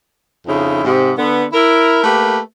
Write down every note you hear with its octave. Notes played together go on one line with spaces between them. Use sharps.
F2 C#3 D#4 E4
G#2 C3
D3 B3
E4 A#4
A3 A#3 G4 B4